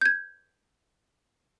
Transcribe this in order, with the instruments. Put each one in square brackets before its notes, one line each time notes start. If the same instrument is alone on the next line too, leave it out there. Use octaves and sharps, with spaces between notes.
[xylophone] G6 G#6